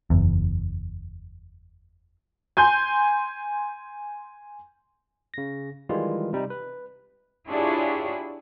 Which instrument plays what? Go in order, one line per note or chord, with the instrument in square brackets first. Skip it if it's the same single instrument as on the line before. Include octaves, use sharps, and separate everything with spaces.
[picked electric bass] F#1 E2
[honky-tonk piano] G#5 C6 G6
[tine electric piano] C#3 A#6
D#3 E3 G3 G#3 F4
C3 G3 D#4
B4
[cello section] D4 E4 F4 G4 G#4 C#5